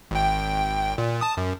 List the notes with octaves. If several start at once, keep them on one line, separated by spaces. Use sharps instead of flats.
G#1 G5
A#2
A5 D#6
F#2